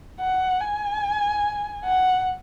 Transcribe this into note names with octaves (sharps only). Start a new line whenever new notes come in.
F#5
G#5
F#5